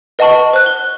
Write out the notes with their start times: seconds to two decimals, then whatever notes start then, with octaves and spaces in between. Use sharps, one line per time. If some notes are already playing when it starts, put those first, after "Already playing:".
0.19 B4 D#5 F#5 A5 C#6 F#7
0.53 C5 F#6
0.66 G7